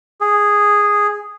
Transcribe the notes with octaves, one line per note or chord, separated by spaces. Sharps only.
G#4